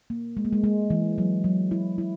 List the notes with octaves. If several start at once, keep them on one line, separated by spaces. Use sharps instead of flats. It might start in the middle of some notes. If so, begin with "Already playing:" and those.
A#3
G#3
A#3
G#3
G#3
E3
F#3
F#3
E4
E4